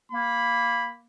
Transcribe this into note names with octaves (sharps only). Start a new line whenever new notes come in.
A#3 B5